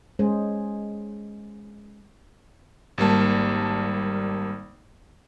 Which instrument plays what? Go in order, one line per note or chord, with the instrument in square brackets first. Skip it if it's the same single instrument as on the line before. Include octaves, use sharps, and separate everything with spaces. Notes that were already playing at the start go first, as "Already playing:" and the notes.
[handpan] G#3 C#4 G#4 C5
[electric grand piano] G#1 G3 A#3 A5